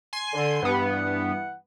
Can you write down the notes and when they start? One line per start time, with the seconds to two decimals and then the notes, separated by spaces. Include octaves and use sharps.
0.13 G#5 C6 C7
0.33 D3
0.63 G2 E3 B3 F#5